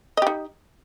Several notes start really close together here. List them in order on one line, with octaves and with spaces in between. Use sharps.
D#5 G4 D#4